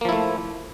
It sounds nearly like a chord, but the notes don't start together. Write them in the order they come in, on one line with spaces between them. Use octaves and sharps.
A#3 F3 E4 A3